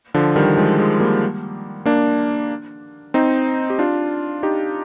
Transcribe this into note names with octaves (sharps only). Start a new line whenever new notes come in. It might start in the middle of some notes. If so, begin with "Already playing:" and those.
D3 F3
D#3 G3
F3 G#3
F3 G#3
G3 A#3
A#3 D4
C4 D#4
G4
D4 F4
D#4 G4